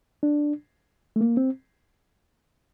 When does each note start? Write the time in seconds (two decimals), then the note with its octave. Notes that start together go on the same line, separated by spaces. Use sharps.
0.23 D4
1.16 A3
1.21 A#3
1.37 C4